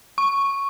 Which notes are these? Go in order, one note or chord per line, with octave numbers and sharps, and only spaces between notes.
C#6